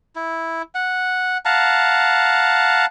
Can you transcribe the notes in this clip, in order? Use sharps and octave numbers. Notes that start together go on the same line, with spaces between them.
E4
F#5
F5 F#5 A5 A#5